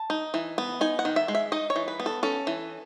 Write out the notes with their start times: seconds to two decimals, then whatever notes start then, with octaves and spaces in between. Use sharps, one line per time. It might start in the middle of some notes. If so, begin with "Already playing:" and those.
Already playing: A5
0.10 D#4
0.34 E3
0.58 B3
0.81 D#4 G#5
0.99 F#5
1.05 D#3
1.16 E5
1.28 G#3
1.35 E5
1.52 D#4 D#5
1.70 C#5
1.76 E3
1.88 B4
2.00 B3
2.06 A4
2.23 C#4 A4
2.47 E3